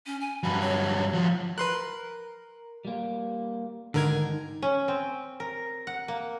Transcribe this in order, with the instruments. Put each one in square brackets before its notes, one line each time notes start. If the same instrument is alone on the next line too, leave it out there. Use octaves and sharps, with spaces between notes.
[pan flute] C#4
G#5
[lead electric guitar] G2 F#3 [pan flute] B5
[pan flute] C#5
[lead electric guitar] F3 F#3
[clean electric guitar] A#4 [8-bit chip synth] B4 C6 F#6
[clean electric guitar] G3 A#3
[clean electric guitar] G#2 D#3 D#4 [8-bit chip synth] D3 A#4 G#6
[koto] C#4
C4
A#4
F#5
A#3